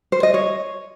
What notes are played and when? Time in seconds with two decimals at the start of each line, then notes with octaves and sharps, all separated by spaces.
0.12 C5
0.23 D#5
0.34 C#5